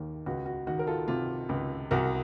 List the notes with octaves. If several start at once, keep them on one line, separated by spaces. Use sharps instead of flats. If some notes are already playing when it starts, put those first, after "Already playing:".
Already playing: D#2 D#3
C#2 F#4
F#4
D#3 F#4
A#4
F4 A4
C3 F4
C#2
C2 F#4 A#4